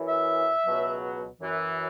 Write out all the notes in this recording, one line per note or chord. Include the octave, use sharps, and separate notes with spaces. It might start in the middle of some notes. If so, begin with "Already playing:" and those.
Already playing: F#2 E3
E5
C#2 B2 F#3
F#2 E3